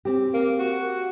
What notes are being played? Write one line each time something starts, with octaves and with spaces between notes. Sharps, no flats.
C4 G4
A#3
F#4